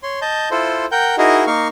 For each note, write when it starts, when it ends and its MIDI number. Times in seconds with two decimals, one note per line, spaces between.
0.03 0.20 73
0.03 0.20 84
0.22 0.49 75
0.22 0.49 81
0.22 0.49 91
0.51 0.85 64
0.51 0.85 65
0.51 0.85 69
0.51 0.85 72
0.92 1.16 70
0.92 1.16 78
0.92 1.16 79
0.92 1.16 91
1.18 1.45 63
1.18 1.45 64
1.18 1.45 66
1.18 1.45 68
1.18 1.45 70
1.18 1.45 75
1.47 1.68 58
1.47 1.68 63
1.47 1.68 70
1.47 1.68 77
1.47 1.68 85